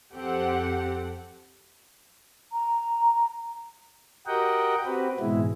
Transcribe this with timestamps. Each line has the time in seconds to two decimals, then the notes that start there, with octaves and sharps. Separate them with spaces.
0.13 F2 C4 G4 A4 F#5
2.52 A#5
4.27 F#4 G4 A#4 D#5 F#5 G5
4.86 C4 F#4 G4 B4
5.20 G#2 B2 E3 G#3 E4